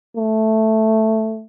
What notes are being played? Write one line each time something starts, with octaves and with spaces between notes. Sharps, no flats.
A3